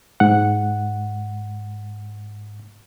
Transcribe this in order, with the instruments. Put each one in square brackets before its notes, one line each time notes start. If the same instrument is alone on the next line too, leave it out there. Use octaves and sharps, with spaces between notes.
[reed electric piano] G#2 F#5